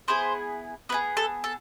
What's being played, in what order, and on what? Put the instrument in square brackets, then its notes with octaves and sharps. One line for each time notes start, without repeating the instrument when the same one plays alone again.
[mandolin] B3 E4 G#4 C5
B3 E4 G#4 B4
A4
A4